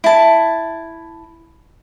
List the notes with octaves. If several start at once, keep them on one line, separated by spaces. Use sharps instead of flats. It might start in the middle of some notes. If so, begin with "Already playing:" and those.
E4 A5